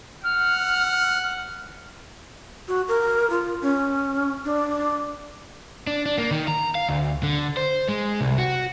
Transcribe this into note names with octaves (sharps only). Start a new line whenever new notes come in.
F#5 F6
F#4
A#4
F4
C#4
D4
D4
D4
A#3
D#3
A#5
F5
D2
D3
C5
G#3
C2
F#4